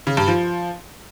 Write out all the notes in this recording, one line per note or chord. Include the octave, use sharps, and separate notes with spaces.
C#3
G2
F3